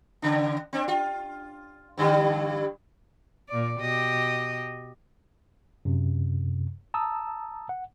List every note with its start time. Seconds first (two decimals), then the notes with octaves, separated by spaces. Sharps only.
0.22 C#3 D4
0.73 C4 D4
0.88 F4
1.98 G2 D3 G3
3.49 A#2 D5
3.80 B2 G4 D#5
5.85 F#2 C3
6.94 A5 A#5 D#6 E6
7.69 F#5